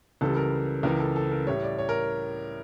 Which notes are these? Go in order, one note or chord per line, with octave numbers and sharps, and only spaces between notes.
C#2 C#3 E3 G3 A4
A#4
C#2 C#3 E3 A#4
A4
A4
A#4
A2 G3 C#5
D5
C#5
A#4